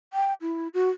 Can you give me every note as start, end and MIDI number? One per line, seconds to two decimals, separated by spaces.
0.13 0.33 79
0.41 0.68 64
0.74 0.90 66